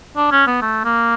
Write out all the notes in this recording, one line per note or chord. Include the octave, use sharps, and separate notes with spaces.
D4
C#4
B3
A3
A#3